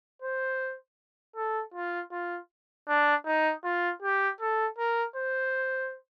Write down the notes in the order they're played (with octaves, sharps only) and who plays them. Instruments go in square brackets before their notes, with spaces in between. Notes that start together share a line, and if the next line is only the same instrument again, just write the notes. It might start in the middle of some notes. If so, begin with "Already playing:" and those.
[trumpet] C5
A4
F4
F4
D4
D#4
F4
G4
A4
A#4
C5